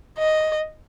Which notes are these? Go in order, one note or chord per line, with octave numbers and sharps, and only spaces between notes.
D#5